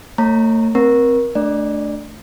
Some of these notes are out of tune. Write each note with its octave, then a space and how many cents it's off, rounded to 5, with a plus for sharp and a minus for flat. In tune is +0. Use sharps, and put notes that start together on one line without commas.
A3 +40 C#5 -10 A#5 -25
C4 +0 A#4 +30
A3 +0 D4 +0 D5 +0